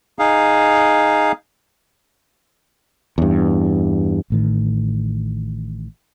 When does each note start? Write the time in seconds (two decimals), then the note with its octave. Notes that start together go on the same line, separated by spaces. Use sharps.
0.19 D#4 G#4 F5
3.18 E2 G2
4.30 A1 A2 D#3